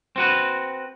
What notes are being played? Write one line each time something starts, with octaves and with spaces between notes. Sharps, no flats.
C4 F#4 B4